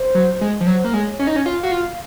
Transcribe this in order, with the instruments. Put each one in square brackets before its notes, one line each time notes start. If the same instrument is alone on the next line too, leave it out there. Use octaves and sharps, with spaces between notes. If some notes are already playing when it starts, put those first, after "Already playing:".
Already playing: [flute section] C5
[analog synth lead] F#3
G#3
F3
[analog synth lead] F#3 [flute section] C5
[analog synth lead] A#3
[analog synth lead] G#3 [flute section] C#5
[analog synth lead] C#4 [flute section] D#5
[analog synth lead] D#4
C#4
[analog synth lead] F4 [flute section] F5
[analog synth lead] F#4
F4